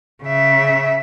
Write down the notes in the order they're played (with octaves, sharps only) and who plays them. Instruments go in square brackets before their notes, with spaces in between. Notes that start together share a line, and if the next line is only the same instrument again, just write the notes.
[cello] C#3 E5